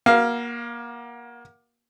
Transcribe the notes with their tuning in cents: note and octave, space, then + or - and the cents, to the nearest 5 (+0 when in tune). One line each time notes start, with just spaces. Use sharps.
A#3 +25 F#4 +0 F5 +0